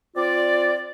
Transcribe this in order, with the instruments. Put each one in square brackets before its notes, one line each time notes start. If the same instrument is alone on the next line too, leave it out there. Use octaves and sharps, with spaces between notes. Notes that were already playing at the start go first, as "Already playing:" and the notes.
[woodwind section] C4 F4 D5